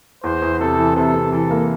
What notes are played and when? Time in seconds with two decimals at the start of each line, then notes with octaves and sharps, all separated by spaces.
0.24 E2 C5
0.42 E2
0.60 C3 A4
0.78 E3
0.96 C3 A4
1.14 C3
1.32 E3 A4
1.51 A#3